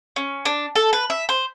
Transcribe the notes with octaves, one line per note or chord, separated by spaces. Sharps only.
C#4
D4
A4
B4
E5
C5